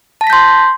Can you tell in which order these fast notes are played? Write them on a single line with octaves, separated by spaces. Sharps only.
A5 A#6 B6 G6 C6